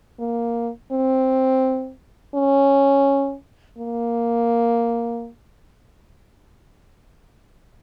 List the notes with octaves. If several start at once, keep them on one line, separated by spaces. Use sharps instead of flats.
A#3
C4
C#4
A#3